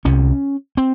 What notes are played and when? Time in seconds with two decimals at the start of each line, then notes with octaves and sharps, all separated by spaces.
0.05 C2 C3 C#4
0.77 C4